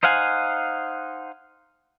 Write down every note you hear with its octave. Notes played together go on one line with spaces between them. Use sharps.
D#4 C5 F5 F#5 G#5